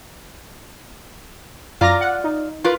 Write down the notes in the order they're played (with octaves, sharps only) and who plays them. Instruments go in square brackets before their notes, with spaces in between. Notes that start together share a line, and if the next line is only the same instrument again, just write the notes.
[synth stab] F#2 A#5 A#6 [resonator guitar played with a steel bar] F4 D5
[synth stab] F#5
D#4
[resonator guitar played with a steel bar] F4 A#4 B4